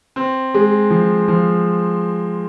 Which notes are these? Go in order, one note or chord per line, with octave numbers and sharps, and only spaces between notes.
C4
G#3
F3
F3